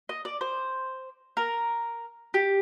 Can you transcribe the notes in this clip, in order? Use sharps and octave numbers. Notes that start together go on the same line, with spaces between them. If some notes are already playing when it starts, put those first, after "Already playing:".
D#5
D5
C5
A#4
G4